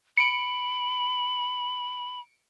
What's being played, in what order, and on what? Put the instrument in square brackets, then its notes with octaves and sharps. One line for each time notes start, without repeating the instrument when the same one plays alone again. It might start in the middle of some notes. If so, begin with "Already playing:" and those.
[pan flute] B5 [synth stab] C#7 D7